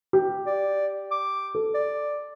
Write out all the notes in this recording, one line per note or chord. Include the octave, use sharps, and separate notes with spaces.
G4
D5
D6
A4
D5